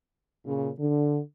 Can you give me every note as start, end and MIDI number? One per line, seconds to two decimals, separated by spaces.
0.45 0.69 46
0.45 0.69 49
0.79 1.19 50